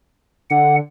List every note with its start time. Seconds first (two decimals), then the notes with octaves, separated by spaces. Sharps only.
0.51 D3 F#5